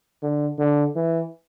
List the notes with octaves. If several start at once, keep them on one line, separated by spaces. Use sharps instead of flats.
D3
D3
E3